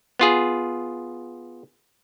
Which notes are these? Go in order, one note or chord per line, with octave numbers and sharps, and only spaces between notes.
B3 F4 G#4